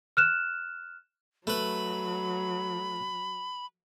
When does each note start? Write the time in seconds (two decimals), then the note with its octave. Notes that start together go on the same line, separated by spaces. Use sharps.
0.17 F6 F#6 E7
1.47 F#3 A3 B4 B5